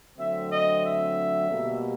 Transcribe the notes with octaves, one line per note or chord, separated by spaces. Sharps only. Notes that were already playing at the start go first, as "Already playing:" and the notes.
D3 F#3 A3 C4 E5
D#5
E5
B2 G3 A#3